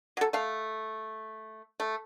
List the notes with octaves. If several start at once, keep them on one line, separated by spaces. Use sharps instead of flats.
F#3 A4
A3 F5
A3